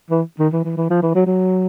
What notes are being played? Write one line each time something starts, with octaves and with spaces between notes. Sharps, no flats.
E3
D#3
E3
E3
E3
F3
E3
F#3
F#3